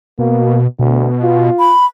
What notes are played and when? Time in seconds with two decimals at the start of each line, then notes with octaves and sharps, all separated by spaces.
0.19 B2 A#3
0.79 D2 B2
1.22 F4
1.59 B5